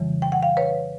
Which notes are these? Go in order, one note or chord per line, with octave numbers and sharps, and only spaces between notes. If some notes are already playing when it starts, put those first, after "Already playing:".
Already playing: F2 C#3 E3 G3
G5
F#5
F5 G5
B4 C#5